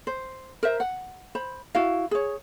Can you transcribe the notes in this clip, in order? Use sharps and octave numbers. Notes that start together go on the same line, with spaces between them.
C5
A#4 C5 E5
F#5
C5 B5
E4 F#4 F5
G#4 C#5